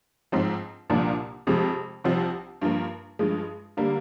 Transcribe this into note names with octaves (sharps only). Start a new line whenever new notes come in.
G#2 F3 C4
C2 A#2 F3 A#3 D4
F2 C3 F3 G#3
C2 C3 F3 C4
G2 F3 A#3
G2 F3 G#3
D3 G3 A#3